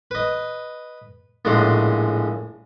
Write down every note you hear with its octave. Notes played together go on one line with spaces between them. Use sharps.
B4 D#5
A#1 A2 C#3 G#3 F#4 C6